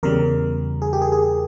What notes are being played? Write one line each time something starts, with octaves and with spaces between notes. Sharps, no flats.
E2 C#3 G3 A#4
G#4
G4
G#4
G#4